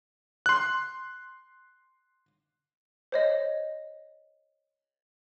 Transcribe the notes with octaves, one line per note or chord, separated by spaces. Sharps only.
C6 F#6
C5 C#5 D#5